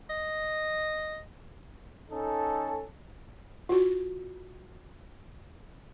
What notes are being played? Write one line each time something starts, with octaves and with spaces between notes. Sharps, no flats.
D#5
C#4 D#4 A4
F4 F#4